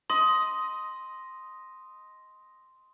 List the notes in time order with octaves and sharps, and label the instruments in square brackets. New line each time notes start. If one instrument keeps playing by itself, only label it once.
[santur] D#5 [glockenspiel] C6